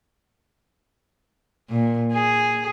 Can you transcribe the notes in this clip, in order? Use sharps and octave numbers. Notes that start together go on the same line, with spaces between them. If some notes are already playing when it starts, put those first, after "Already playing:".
A#2
G#4